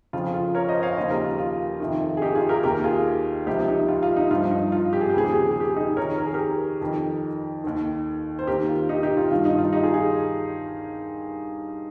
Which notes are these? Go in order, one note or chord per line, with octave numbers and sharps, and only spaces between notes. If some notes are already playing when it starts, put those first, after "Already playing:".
F2 C#3 F3 F4
F4
A#4 C#5
C5 D#5
C#5 F5
D#2 C#3 F3 C5 D#5
G4 A#4
F4
F4
F2 C3 D#3
G#4
D#4 G4
F4 G#4
G4 A#4
D#2 D#3 G4 A#4
F4 G#4
C#2 C3 F3 D#4 G4
D#4 G4
F4
F4
D#4
G2 F3 F4
D#4
F4
G4
G#4
G4
D#2 C#3 F3 G#4
G4
G#4
G4
G#4
G4
G#4
D#4 G4
F2 D#3 A#4 C#5
A#4
G#4
G4 A#4
F2 D#3
D#2 D#3
C5
D#2 D#3 G4 A#4
F4
D#4 G4
D#4 G4
F4
G2 D#3 F4
D#4
F4
D#4 G4
F4 G#4
F4 G#4